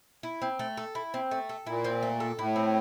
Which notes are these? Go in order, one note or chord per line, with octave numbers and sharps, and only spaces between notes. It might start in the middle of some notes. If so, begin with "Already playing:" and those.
E4
C4
A3
A4
E4
C4
A3
A4
A#2 E4
C4
A3
A4
A2 E4
C4